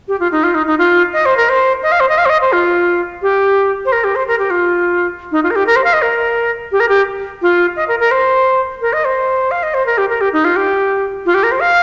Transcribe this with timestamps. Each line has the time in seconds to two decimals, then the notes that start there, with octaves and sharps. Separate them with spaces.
0.08 G4
0.20 F4
0.32 D#4
0.43 F4
0.54 D#4
0.67 D#4
0.78 F4
1.13 D#5
1.26 C5
1.37 A#4
1.49 C5
1.83 D#5
1.92 F5
2.00 C5
2.09 D#5
2.18 F5
2.25 C5
2.29 D#5
2.41 C5
2.52 F4
3.22 G4
3.85 C5
3.92 A#4
4.04 G4
4.15 C5
4.28 A#4
4.39 G4
4.50 F4
5.32 D#4
5.44 F4
5.51 A#4
5.56 G4
5.67 A#4
5.76 C5
5.84 F5
5.93 D#5
6.02 A#4
6.72 G4
6.80 A#4
6.89 G4
7.42 F4
7.76 D#5
7.88 A#4
8.00 A#4
8.11 C5
8.81 A#4
8.93 D#5
9.05 C5
9.51 F5
9.63 D#5
9.74 C5
9.86 A#4
9.98 G4
10.09 A#4
10.21 G4
10.33 D#4
10.44 F4
10.56 G4
11.26 F4
11.34 G4
11.43 A#4
11.52 C5
11.60 F5